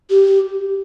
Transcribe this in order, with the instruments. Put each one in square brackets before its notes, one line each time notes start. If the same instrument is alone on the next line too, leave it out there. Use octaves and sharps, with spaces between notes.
[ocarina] G4